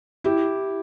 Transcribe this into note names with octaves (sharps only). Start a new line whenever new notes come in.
E4 G4